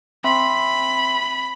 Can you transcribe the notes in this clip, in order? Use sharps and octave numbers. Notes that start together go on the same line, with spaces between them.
C4 E5 B5 C6